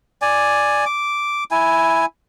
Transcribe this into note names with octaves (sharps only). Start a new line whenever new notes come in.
D5 G#5
D6
E4 G#5